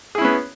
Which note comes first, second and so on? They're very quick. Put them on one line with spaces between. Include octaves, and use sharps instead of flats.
G#4 E4 C#4 B3